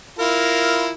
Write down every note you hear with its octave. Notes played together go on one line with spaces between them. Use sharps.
E4 F4 A#4